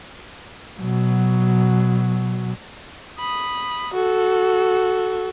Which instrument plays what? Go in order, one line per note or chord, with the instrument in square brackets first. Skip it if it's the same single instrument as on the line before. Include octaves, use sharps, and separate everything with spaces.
[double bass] B2 F#3
[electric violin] B5 D#6
F#4 A4